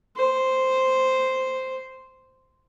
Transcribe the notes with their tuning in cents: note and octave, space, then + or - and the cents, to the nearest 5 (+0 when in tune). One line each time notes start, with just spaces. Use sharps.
C5 -5